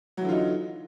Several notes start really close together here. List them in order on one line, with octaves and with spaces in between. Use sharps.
F#3 E3 D3 F4 D#4